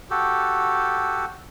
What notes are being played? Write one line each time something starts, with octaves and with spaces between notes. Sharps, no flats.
F#4 G4 A4